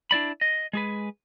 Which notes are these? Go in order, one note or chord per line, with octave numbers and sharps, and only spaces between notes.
D4 E4 D5 B5
D#5
G#3 G#4 B4